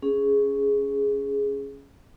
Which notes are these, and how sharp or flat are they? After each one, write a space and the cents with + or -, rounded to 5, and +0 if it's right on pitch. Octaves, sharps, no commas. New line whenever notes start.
C#4 +0 G#4 +0